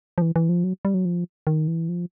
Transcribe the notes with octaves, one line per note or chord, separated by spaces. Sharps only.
F3
E3
E3
F3
F#3
G3
F#3
F3
D#3
E3
F3